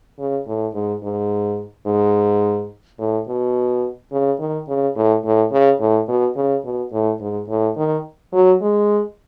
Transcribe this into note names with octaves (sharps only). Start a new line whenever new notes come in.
C#3
A2
G#2
G#2
G#2
A2
B2
C#3
D#3
C#3
A2
A2
C#3
A2
B2
C#3
B2
A2
G#2
A2
D#3
F#3
G#3